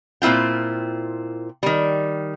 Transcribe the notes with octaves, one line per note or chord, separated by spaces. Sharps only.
A#2 C4 E4 F4 G5
D#3 G3